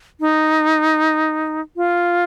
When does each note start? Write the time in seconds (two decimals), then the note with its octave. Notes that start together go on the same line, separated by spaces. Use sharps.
0.20 D#4
1.76 F4